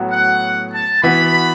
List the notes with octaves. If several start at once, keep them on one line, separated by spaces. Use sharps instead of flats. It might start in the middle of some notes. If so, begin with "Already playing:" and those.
Already playing: A2 F#3 B3 F#4
F#5
A5
E3 B3 F#4 B5